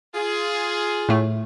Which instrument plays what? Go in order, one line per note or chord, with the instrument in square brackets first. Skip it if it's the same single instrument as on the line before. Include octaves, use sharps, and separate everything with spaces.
[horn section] F4 G#4
[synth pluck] A2 A3